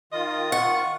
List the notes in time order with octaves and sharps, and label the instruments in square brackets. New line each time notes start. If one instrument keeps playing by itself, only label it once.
[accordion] D#3 F4 [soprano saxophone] D#5
[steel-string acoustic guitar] F#5 [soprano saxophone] C#6